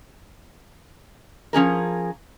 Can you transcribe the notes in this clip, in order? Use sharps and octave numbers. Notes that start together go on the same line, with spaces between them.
F3 C#4 G#4 A#4